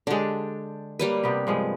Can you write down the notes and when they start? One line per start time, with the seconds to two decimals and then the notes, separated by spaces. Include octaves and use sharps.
0.07 D3 G#3 D4 G4
0.99 G3 A#3 B4
1.23 C3 B3 G4
1.47 G2 F3 G#3